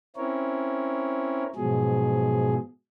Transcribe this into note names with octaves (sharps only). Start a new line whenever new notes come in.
C4 C#4 E4 A#4 C#5
G#2 B2 F3 F#3 G#4